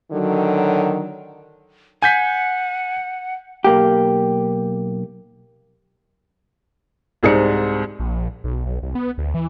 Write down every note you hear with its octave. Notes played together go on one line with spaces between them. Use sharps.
D3 D#3 F#3
F#5 G#5 G6 B6
B1 A#3 G4
C2 G#2 G#4 C5 D5 C#7
A#1
B1
B1
C2
B3
D2
E3